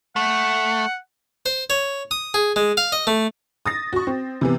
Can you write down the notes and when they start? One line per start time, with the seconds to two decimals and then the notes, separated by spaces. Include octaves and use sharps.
0.16 A3 F#5
1.46 C5
1.70 C#5
2.11 D#6
2.34 G#4
2.56 G#3
2.77 F5
2.92 D#5
3.07 A3
3.66 D#6 A6 A#6
3.93 F#4 C#6
4.07 C4
4.41 C3 E3 B3